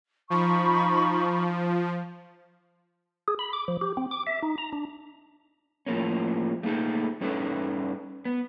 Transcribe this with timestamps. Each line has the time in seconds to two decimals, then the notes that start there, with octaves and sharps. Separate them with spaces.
0.30 F3 D#4 B5 C#6
3.28 G#4
3.39 B5
3.53 D6
3.68 F3
3.81 G4
3.97 C4
4.11 D6
4.27 E5
4.43 D#4
4.58 A#5
4.73 D4
5.86 A2 F3 A#3 C#4
6.63 A3 A#3 D#4 G#4 A4
7.21 G2 C#4 D#4 A4 B4
8.25 B3